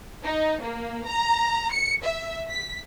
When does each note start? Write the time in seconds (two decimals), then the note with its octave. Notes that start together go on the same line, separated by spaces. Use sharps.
0.23 D#4
0.62 A#3
1.06 A#5
1.72 C#7
2.03 E5
2.49 B6